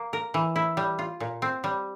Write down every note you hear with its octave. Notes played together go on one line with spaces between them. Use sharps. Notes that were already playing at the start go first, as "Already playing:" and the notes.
Already playing: A#3
A#4
E3
E4
G3
F4
A#2
C4
G3